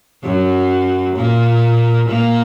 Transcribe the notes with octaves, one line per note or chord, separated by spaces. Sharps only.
F#2 F#3
A#2 A#3
A#2 A#3